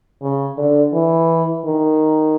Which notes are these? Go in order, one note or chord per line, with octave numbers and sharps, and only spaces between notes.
C#3
D3
E3
D#3